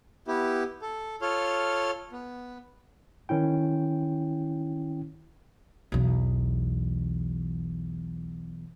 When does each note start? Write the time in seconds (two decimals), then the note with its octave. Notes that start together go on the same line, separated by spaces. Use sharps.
0.28 B3 E4 G4
0.82 A4
1.22 F4 A4 C#5 C6 F6
2.12 B3
3.29 D#3 C#4 E4 G5
5.92 B1 E2